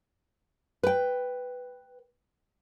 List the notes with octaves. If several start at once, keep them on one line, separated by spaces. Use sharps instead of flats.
B4 G5